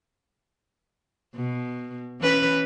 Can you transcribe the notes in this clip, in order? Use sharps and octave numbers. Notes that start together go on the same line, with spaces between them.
B2
E3 C#4 B4